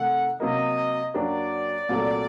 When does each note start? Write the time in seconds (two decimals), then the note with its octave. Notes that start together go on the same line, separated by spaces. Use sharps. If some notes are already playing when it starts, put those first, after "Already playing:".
Already playing: C3 D#3 A3 D#4 F#5
0.40 C3 F#3 A#3 D#5
1.14 F#2 F#3 A#3 D4 G4 D5
1.89 C2 A#2 F#3 A3